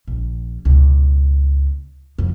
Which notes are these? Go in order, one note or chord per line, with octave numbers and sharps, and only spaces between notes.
A#1
C#2 B2
F2 C#3